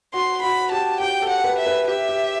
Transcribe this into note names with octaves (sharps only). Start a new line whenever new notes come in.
F#4 C6
F#4 B5
G4 A5
G4 G5
A4
F#5
B4
E5
B4
G4 E5
G4